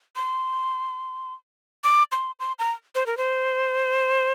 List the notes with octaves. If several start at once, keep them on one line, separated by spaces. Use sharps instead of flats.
C6
D6
C6
C6
A#5
C5
A#4
C5